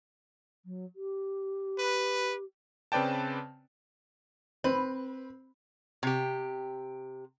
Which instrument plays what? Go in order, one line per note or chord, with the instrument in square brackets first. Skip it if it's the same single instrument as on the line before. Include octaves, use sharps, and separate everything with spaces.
[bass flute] F#3
G4
[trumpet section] B4
[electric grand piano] C#3 C4 B4 D5 G5 A5
[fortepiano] C4 [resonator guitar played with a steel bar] B4
[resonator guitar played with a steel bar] C3 G4